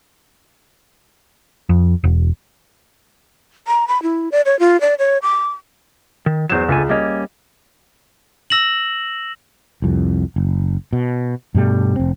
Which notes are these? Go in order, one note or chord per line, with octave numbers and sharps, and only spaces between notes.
F2
E1
A#5
B5
E4
D5
C#5
F4
D5
C#5
D6
D#3
E2 F#3 C5 E7
C#2 D3 A3 G#5
G3 A#3 C#4 D#5
E6 A#6 E7 F#7
C2 F2
F#1
B2
G2 B2 G3 A3
F1 C4